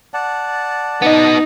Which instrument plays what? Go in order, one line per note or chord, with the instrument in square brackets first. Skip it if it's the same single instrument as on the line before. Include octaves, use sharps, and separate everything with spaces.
[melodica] D5 F#5 A5
[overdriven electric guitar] B3 D#5 [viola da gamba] D#4